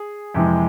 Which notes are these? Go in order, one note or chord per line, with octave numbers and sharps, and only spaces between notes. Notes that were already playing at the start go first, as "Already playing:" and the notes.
Already playing: G#4
F2 C3 E3 G#3